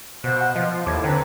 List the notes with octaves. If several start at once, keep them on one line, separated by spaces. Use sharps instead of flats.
B2 F#4 C5 F5 F#6
F#5
F3 F4 C5 D#5
D#2 A2 A5 D6 G#6
D3 C4 B4 A#5